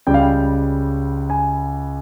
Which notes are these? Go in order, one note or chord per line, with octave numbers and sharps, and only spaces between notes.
C#2 C#3 G3 G5
F5
G5
G#5